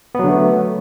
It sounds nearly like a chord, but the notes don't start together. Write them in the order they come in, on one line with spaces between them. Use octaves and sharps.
B3 F#3 D3 A3